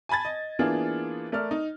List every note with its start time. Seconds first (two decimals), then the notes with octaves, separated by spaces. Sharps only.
0.09 G#5 A5 B5 G#6 A6
0.25 D#5
0.59 E3 A#3 B3 D4 F4 G#4
1.32 A3 A#4 D5 F6
1.51 D#4